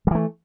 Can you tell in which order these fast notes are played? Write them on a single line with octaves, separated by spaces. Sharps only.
F#3 E3 A3